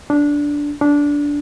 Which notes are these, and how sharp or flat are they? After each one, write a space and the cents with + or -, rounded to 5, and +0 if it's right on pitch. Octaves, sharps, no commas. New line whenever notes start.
D4 -10
D4 -15